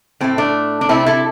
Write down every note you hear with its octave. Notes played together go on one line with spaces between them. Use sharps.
A2 A3 C4
A3 D4
D4
C3 A3 C4 E4
E4 A4